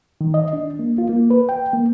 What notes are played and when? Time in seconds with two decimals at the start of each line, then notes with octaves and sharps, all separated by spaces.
0.21 D#3
0.34 D#5
0.53 D4
0.79 A#3
0.98 F4
1.09 A#3
1.30 B4
1.49 G5
1.73 A#3